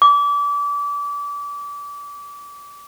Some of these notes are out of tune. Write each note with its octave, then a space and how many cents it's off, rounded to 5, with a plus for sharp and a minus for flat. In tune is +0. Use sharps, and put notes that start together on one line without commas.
D6 -30